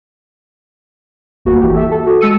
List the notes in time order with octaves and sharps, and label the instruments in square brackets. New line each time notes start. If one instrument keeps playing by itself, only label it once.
[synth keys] G1 D#2 A#3 F#4
E3 F#4 G4
A4 E5
A4
F#4
G#3 A5 E6 C#7 D#7